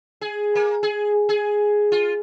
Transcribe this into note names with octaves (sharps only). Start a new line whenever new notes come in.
G#4
A#3
G#4
G#4
F4